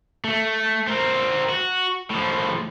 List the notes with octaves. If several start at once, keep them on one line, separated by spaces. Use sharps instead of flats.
A3
C4 A#4
F#4
A2 F3